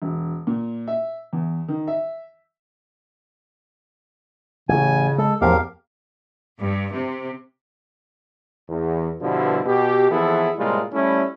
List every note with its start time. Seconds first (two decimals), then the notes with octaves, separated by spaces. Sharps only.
0.02 E1
0.47 A#2
0.88 E5
1.33 E2
1.68 D#3
1.88 E5
4.69 A1 C#3 G#5
5.18 G#3 A4
5.41 A1 E2 F3 G4 A#4 F5
6.58 G2
6.93 C3
8.69 E2
9.21 G2 B2 D3 F3 G3 E4
9.65 B2 G4
10.10 F2 E3 B3 E4 G#4 A4
10.57 A2 C3 G3 G#3 A#3 F4
10.92 G3 A3 C#4 E4